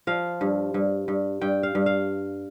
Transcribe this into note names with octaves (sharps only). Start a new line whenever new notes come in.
F3 F5
G2
G2
G2
G2 G5
F5
G2
F5